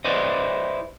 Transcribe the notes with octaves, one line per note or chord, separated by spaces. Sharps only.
E4 G4 B4 C5 D5 D#5